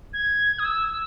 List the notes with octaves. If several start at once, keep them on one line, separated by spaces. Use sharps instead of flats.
G#6
D#6
E6